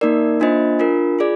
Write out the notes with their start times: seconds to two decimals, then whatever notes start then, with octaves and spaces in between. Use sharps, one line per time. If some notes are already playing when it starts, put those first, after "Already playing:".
0.01 A#3 D#4 A#4 D5
0.40 A#3 D4 F4 C5 D#5
0.79 D4 F4 A#4
1.19 F4 G#4 D5